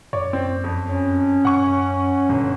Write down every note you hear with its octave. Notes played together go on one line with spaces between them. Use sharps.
F#2 C#5 D5
C4
F2
C#4
F#2 F#5 C#6
G1 A#2